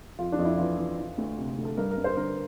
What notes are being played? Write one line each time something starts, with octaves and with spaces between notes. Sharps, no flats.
F2 F4
D4
F2
E4
E3 F4
E3
E3
D2
C3
D2
A4
G2 A#4
A#4
G2
C5
D3 A#4